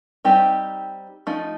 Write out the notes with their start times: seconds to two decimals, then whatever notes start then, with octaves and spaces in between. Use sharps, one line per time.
0.25 G3 C4 D#4 G4
1.27 F3 A3 D#4